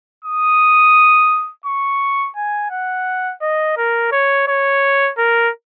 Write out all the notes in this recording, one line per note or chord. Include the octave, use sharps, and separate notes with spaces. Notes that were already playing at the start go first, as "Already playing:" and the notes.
D#6
C#6
G#5
F#5
D#5
A#4
C#5
C#5
A#4